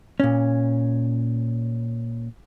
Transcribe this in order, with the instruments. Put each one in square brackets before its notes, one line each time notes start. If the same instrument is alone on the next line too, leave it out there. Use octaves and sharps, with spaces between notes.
[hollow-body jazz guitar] A#2 C#4